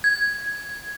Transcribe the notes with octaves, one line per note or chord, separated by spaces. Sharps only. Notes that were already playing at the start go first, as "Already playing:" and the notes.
G#6